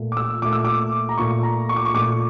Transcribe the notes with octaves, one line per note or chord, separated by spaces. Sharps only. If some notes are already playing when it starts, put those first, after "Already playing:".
Already playing: A#2 A3
D6
E6
A#2 A3 D6
E6
D6
A#5
A#2 A3 C#6
A#5
C#6
D6
C#6
A#2 A3 D6